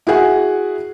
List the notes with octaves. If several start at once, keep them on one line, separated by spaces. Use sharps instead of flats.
E4 F#4 G#4 F#5